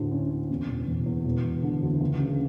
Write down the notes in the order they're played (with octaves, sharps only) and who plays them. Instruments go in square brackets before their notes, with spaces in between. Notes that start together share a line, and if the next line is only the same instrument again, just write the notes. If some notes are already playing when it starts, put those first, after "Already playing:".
Already playing: [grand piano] D2 A2 D3
C#4
C#4
E2
E1
E1
E2
E1
E1
D3
D2
C#2
C#3